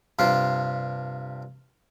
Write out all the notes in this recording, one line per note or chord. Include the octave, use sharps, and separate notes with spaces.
G2 C3 F4